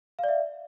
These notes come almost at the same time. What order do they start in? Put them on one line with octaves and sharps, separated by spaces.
F5 D5 E5